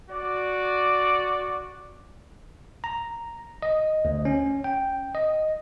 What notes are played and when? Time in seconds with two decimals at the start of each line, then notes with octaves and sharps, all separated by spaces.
0.11 F#4 D5
2.84 A#5
3.62 D#5
4.05 D2
4.25 C#4
4.64 G5
5.15 D#5